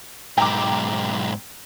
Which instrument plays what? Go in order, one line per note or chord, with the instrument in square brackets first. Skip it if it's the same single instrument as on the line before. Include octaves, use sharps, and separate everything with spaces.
[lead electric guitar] B1 G#2 [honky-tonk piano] G5 A#5 D6